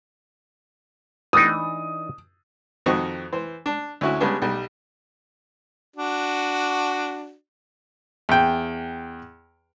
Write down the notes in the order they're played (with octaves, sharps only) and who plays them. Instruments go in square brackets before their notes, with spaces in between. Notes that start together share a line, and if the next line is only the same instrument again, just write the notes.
[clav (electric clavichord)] E3 D4 D#4 [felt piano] D#6
[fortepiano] F2 D#3 C4 F#4 D#5 C#6
E3 C5
D4
D2 C#4 E4 F#4
C#3 G3 G#3 B3 D4
B1 G3
[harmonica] D4 F#4
[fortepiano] E2 G5